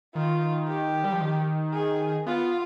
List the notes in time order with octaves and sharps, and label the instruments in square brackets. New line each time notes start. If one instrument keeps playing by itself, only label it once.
[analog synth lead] D#3 [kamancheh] F4
[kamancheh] G4
[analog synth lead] G3
F3
D#3
[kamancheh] G#4
[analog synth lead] B3 [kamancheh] F4